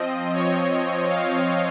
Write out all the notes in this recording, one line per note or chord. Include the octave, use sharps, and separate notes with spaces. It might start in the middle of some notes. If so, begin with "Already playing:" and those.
Already playing: F3 C4 D#5
C#5
F5